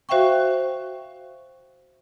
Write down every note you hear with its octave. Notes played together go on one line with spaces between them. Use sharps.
F#4 C5 E5 F5 G5 C#6